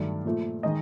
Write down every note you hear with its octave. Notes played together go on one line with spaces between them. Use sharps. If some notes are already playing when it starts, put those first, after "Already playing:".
Already playing: G2 D#3 F#3 A3 D5
A#2 F3 A3
D#3 G#3 D#5